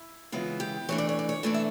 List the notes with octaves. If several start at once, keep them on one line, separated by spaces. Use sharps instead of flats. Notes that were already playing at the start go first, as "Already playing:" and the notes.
Already playing: E4
C#3 E3 G#3 B3 E4 F4
G4
E3 A3 D4 C#5
D5
C#5
D5
C#5
E3 A3 D4 D5
E5